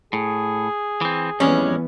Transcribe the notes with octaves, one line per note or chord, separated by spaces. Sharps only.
A2 G#4
E3 C4
F2 E3 G3 G#3 B3 C#4